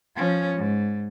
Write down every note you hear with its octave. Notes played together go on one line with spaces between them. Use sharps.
F3 C#4
G#2